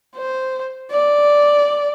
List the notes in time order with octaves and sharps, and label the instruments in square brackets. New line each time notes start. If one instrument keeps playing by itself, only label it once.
[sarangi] C5
D5